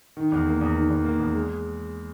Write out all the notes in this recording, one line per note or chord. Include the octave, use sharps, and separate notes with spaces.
D#3
E2
A#3
E2
D#3
E2
A#3
E2
G#3